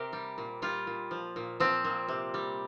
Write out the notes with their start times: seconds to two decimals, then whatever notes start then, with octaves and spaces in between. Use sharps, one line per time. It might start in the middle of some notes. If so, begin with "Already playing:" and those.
Already playing: C3 G4 A#4
0.13 G3
0.38 A#2
0.62 G3 F4
0.87 A#2
1.11 F3
1.36 A#2
1.60 F3 C4
1.85 A#2
2.09 C3
2.34 G3